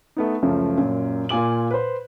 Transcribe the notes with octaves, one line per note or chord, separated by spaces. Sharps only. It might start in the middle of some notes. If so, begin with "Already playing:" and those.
A3 B3 D#4
C#2 F#2 F3 A3
F#2 A#2
A#2 F4 G#5 D6 F#7
B4 C5